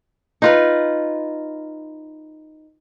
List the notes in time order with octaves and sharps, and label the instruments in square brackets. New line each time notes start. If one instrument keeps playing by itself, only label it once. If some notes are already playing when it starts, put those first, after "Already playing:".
[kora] D#4 F4 B4